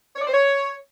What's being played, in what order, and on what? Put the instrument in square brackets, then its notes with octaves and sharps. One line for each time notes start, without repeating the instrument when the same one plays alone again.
[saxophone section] C#5
D5
C5
C#5